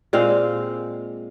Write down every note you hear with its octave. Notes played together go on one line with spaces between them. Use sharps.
A#2 G#3 C4 F5